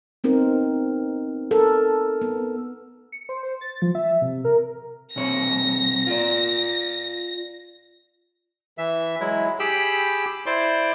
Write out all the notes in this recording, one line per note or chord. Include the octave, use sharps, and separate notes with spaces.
B3 C4 D#4 A#4
A4 A#4
B3
C#7
C5
C5
A6
F3
E5
C3
A#4
B1 C3 C#5 A#6
F4 D5
E3 E5
F#3 G#3 E4
G4 G#4 G5 B5 E6
E4 C5 D5 C6 D6